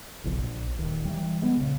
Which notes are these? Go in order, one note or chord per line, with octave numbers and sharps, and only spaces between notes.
F#1 B1 F3
A#1
D#1 D#2
E3 G3
G#3 B3
A#1 C#3